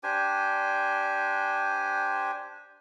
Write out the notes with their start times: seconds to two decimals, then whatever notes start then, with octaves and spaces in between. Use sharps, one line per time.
0.03 D4 G4 C5 G#5